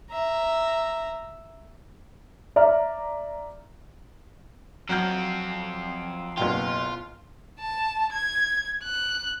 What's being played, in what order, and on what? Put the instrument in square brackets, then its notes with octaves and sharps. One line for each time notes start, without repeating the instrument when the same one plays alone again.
[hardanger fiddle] E5 A#5
[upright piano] D5 E5 A#5 F6
[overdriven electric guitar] F2 C4 [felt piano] F#3 F6 G6
[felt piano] F#1 B2 G5 [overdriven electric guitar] F4
[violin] A5
G#6
F#6